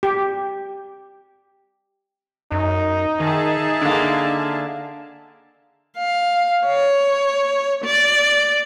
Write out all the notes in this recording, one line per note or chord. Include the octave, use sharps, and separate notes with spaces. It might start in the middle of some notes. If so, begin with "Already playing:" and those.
G4
F#2 D#4
D#3 G#4 E5 A5
D3 A#3 D4
F5
C#5
D5